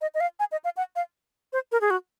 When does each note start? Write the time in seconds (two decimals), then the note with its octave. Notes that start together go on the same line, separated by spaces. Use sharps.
0.01 D#5
0.15 D#5
0.20 F5
0.40 G#5
0.52 D#5
0.64 F5
0.77 F#5
0.96 F5
1.53 C5
1.72 A#4
1.81 G#4
1.90 F#4